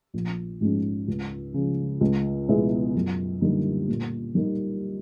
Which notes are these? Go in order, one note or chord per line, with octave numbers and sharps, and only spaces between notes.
A#1
G#2 F3 G#3 C#4
C#2
C#3 F3
C#2
B2 G#3 B3 E4
F#2
D3 G3 A#3 D#4
A#2
G3 A#3 D#4